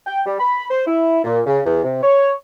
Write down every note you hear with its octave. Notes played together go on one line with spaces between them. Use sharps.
G5
G3
B5
C5
E4
A#2
C#3
E2
C3
C#5